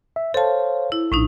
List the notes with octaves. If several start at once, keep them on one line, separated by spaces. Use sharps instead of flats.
E5
A4 C5 C#5 F5 A5
E4
A#1 A2 D4 D#4